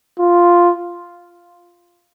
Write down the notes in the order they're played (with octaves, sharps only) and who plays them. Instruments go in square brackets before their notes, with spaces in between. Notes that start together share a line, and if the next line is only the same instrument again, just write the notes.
[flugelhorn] F4